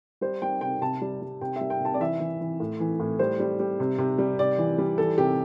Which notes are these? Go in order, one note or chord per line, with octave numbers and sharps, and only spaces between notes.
G3 C5
G3 G5
C3 G5
C3 A5
G3
G3
C3 G5
G3 E5
G5
C3 A5
D5
E3 E5
E3
E3
A2
E3
A2
G3 C5
G3
G3
C3
C3
G3
C3 D5
E3
G3
E3 A4
C3 G4